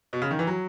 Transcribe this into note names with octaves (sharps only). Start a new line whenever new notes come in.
B2
C#3
D#3
E3
F#3